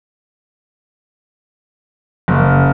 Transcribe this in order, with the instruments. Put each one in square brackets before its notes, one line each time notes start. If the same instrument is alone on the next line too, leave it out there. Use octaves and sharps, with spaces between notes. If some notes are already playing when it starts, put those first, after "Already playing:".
[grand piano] F#1